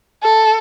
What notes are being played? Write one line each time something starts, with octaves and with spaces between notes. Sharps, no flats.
A4